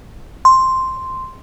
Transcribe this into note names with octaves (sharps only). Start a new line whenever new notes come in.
C6